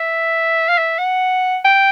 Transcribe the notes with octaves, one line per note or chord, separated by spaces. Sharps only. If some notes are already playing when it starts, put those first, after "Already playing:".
Already playing: E5
F5
E5
F#5
G5